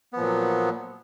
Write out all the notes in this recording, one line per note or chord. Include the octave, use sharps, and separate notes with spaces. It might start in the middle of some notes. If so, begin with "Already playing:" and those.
A#2 F3 F#3 B3